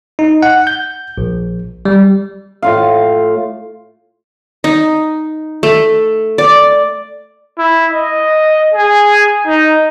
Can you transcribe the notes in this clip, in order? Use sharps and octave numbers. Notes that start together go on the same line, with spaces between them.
D#4
F#5
G6
A#1
G3
A2 F4 F5
D#4
A3
D5
E4
D#5
G#4
D#4